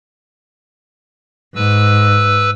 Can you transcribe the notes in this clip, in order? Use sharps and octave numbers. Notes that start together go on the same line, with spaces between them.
G#2 B4 E6